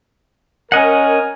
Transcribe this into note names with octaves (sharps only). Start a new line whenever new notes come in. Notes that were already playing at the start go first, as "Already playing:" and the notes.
C#4 A#4 D#5 F#5 G#5